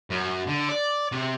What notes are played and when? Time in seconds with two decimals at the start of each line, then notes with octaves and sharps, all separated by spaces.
0.10 F#2
0.49 D3
0.70 D5
1.12 C3